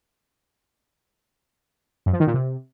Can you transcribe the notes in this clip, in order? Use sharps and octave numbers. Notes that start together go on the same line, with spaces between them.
F#2
F3
D#3
A#2
C3